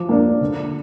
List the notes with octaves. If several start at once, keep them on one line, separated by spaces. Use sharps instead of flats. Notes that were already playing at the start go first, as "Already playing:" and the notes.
Already playing: F3 D6
A#3 D4
D3